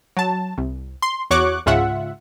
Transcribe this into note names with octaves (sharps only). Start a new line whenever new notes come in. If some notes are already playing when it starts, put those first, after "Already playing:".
F#3 A5
C2
C6
E2 F#4 C#5 C#6 D6 F#6
C#2 G#2 C#3 F4 E5 F#5